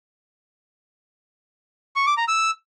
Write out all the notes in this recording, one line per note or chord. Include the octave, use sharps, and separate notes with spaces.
C#6
D6
A#5
E6